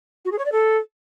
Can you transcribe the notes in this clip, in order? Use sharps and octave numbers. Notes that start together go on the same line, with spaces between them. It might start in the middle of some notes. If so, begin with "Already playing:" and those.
F#4
G#4
C#5
D5
A4